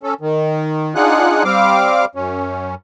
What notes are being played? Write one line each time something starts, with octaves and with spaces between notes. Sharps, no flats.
C#4 A4
D#3
D4 D#4 F4 G#4 F#5 F#6
G3 C4 F5 D6
F#2 C#4